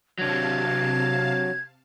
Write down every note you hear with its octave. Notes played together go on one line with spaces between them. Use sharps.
C3 F#3 D4 F5 A5 G#6